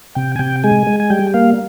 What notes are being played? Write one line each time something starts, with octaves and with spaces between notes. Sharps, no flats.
C3 G5
G#5
C3 G5
G#3 G#5
G#3
G#5
G3 G5
A#3 F5